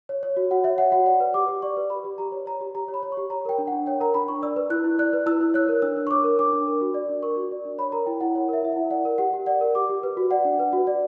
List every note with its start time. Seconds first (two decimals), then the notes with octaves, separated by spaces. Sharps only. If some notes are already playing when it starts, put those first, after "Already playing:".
0.09 C#5
0.23 C#5
0.37 F#4
0.51 F#4 F#5
0.64 C#5 E5
0.78 C#5 F#5
0.92 F#4 F#5
1.06 D5 F#5
1.20 B4
1.34 G4 D6
1.48 G4
1.62 D5 C#6
1.77 B4
1.90 G4 B5
2.04 G4
2.18 G4 A#5
2.32 C#5
2.46 C#5 A#5
2.61 G4
2.75 G4 A#5
2.88 C#5
2.94 B5
3.03 C#5
3.12 C#6
3.17 G4
3.30 C#5 A#5
3.45 A#4 G5
3.58 D4
3.67 F#5
3.73 D4
3.86 C#5 G5
4.00 A#4 A#5
4.14 D4 B5
4.28 D4 C#6
4.42 D5 E6
4.56 B4
4.70 E4 F#6
4.84 E4
4.98 D5 F#6
5.13 B4
5.26 E4 E6
5.41 E4
5.54 C#5 F#6
5.69 A#4
5.82 D4 E6
5.97 D4
6.07 C#6
6.11 C#5 D6
6.24 A#4
6.39 D4 D6
6.53 D4
6.67 A#4
6.81 F#4
6.94 D5
7.09 D4
7.23 A#4 C#6
7.36 F#4
7.51 D5
7.65 D4
7.78 C#5 B5
7.92 A#4 A#5
8.06 E4 G5
8.20 E4 F#5
8.35 C#5 F#5
8.48 A#4 E5
8.62 E4 E5
8.72 F#5
8.76 E4
8.90 D5 F#5
9.05 A#4
9.18 G4 F#5
9.33 G4
9.46 D5 F#5
9.61 A#4
9.75 G4 D6
9.89 G4
10.03 B4
10.17 F#4
10.31 D5 F#5
10.45 D4
10.59 B4
10.73 F#4
10.87 D5